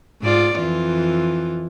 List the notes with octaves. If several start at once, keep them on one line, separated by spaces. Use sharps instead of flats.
G#2 F4 D5
F2 E3 F4